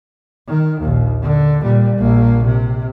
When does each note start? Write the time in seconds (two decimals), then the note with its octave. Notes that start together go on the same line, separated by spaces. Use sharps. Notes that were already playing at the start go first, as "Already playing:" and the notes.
0.48 D#3
0.81 A#1 D#2
1.22 D3
1.62 A#2 G3
1.98 A#1 A#3
2.45 C3